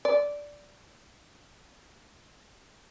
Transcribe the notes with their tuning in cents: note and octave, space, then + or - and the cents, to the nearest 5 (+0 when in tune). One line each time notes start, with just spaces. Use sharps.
D5 -5